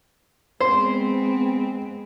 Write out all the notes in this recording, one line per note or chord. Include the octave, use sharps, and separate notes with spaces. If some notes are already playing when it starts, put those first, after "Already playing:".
G#3 B3 C4 C5